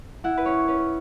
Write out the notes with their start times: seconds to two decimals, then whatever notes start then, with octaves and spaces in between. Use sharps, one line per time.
0.24 E4 F#5
0.37 B4
0.46 C#4 C#5
0.68 C#4 B4